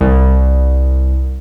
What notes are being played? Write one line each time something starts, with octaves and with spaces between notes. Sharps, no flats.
C2